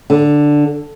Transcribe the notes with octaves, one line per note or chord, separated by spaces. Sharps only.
D3